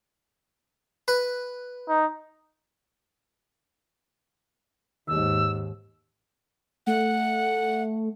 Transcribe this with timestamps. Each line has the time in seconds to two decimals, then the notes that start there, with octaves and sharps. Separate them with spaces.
1.08 B4
1.89 D#4
5.08 D#2 G#2 E6
6.87 A3 F#5